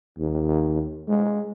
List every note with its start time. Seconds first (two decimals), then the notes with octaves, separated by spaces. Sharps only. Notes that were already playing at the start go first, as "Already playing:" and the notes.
0.18 D#2
1.08 G#3